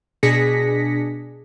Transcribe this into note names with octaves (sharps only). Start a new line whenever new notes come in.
B2 D4 G#4 A#6 B6 C#7